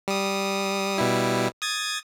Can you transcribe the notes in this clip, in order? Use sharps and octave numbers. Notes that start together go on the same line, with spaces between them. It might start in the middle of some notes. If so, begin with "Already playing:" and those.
G3 D#6
B2 G3 E4
D#6 G#6 A6